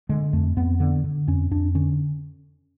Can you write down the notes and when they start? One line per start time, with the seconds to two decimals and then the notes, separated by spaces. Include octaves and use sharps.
0.09 D3 G#3
0.33 F2 A3
0.56 F2 B3
0.80 D3 B3
1.04 D3
1.27 F2 C#4
1.51 F2 D4
1.75 D3 C#4